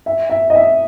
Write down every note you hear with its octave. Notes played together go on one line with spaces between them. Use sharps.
E5
E5
D#5
E5